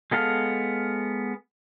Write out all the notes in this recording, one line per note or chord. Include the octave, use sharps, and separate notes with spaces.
G#3 B3 A4 F5